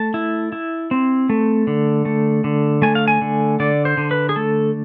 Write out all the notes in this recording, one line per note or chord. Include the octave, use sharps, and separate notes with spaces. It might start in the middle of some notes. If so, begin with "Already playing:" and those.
Already playing: A3 A5
E4
E4
C4
A3
D3
A3
D3
A3 G#5
F5
G#5
D3
D3 D5
C5
D3
B4
G#4
A3 A4